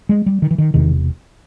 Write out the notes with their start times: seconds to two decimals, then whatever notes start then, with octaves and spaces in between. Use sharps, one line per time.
0.09 G#3
0.26 G3
0.42 D#3
0.51 E3
0.58 D#3
0.74 E1 E2 C3 D#3